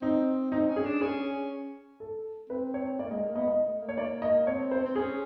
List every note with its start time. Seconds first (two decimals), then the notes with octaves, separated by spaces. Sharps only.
0.02 C4 D#4
0.52 C4 D#4
0.69 C#4
0.76 G#4
0.85 D4
1.01 C#4 G#4
2.00 A4
2.50 C4 B4
2.74 C#5
2.99 A#3 D5
3.11 G#3 D#5
3.23 A#3
3.35 B3 D#5
3.48 D#5
3.64 A3
3.82 A#3
3.89 C#5
3.98 D5
4.22 D#5
4.47 C4 C#5
4.71 C5
4.85 C4
4.96 C#4 G#4